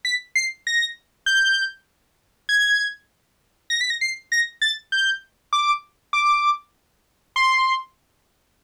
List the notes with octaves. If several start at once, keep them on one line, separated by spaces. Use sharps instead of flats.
B6
C7
A#6
G6
G#6
A#6
B6
A#6
C7
A#6
A6
G6
D6
D6
C6